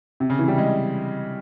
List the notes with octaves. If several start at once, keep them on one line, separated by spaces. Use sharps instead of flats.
C3
C#3
E3
G3
G#3